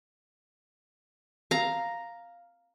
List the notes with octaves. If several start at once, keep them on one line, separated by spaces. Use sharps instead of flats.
F5 A#5